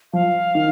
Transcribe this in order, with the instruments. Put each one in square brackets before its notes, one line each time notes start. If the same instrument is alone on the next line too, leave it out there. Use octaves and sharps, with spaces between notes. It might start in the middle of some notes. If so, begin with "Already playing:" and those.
[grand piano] F3 [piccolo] F5
[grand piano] D#3